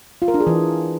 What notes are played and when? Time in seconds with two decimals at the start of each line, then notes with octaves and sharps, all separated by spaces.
0.22 F4
0.28 A#4
0.34 D4
0.41 G#4
0.47 E3